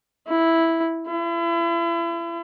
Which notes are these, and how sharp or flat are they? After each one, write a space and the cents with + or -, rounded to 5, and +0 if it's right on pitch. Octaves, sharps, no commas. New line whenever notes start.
E4 -5
E4 +40